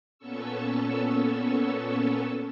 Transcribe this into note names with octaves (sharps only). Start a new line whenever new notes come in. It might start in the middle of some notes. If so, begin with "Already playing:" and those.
A#2 B3 C#4 A4 C#6 E6